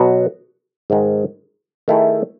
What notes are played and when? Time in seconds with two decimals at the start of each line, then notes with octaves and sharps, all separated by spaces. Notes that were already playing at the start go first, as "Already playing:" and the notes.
Already playing: B2 F#3 B3 F#4
0.90 G#2 D#3 G#3
1.88 D#3 A3 E4 G#4